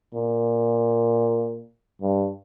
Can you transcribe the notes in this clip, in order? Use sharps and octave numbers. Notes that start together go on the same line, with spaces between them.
A#2
G2